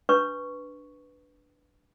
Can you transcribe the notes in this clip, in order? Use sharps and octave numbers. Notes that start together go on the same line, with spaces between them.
D4 B4 C#6